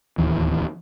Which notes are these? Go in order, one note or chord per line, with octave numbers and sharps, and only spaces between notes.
D1 G1 D#2 E3